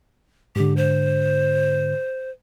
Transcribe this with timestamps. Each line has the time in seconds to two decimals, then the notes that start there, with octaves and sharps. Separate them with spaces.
0.56 G#2 D3 G4
0.77 C5